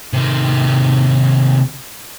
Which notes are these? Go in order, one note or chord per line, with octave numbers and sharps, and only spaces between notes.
C3 D#3